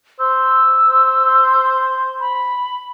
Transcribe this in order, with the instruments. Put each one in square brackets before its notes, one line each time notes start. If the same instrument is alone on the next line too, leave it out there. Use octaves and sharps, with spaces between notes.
[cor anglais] C5 [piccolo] E6
[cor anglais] C5
[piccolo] B5